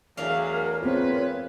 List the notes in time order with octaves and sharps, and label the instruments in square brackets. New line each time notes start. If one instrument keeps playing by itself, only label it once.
[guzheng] E2 D4 F5 [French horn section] F#3 A3 G#4 [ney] A#4
[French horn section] G#3 F4 B4 [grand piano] C4 A#4 [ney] C#5